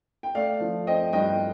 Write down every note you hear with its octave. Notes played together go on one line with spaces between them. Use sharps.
G5
A3 D5 F5
F3
C4 D#5 G5
G2 D#5 G5